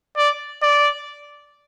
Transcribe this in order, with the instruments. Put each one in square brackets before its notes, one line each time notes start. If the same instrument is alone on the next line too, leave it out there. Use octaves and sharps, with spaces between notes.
[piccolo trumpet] D5
D5